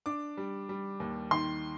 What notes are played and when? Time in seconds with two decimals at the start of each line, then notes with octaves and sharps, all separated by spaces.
0.06 D4 D6
0.37 G3
0.69 G3
1.00 D#2
1.31 D#3 C6